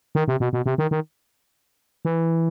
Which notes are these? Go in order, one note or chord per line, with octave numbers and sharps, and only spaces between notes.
D#3
C3
B2
B2
C3
D#3
D#3
E3